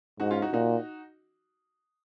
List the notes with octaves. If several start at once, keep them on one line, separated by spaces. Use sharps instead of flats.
G#2 D#4 F#4
C#4 F4
D#4 F#4
A#2 D#4 F#4